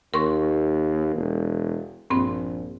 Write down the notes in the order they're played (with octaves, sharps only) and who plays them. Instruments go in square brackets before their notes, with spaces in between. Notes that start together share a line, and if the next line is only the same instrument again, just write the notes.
[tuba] D#2 [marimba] A#4 C6 C#6
[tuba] E1
[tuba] A#1 [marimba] G2 C4 C6